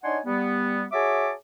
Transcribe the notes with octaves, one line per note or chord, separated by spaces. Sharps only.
D4 D#4 C#5 F#5 G#5 C6
G3 B3
F#4 G#4 C#5 E5 A5 D6